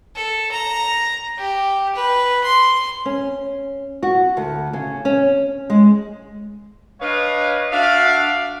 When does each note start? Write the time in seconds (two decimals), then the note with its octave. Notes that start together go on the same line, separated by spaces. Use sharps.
0.15 A4
0.52 A#5
1.38 G4
1.95 B4
2.44 C6
3.05 C#4
4.03 F#4
4.37 D2
4.73 C#3
5.05 C#4
5.70 G#3
7.01 D4 B4 C#5 D#5 F5
7.71 D4 F#4 E5 F5